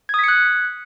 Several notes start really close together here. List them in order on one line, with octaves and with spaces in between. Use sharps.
G#6 D#6 B6 C#7 F#6